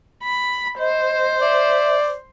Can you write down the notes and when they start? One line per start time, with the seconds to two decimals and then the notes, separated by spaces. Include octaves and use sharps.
0.24 B5
0.79 C5 D#5
1.41 D5 E5